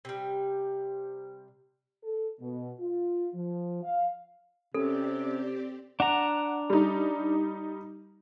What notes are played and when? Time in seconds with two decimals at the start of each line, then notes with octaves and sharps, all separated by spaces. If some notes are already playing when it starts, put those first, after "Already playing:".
0.05 C3 G3
2.04 A4
2.40 B2
2.80 F4
3.34 F3
3.83 F5
4.74 C3 C4 C#4 G4 A4 D5
6.00 D4 F#5 A#5
6.70 G3 D#4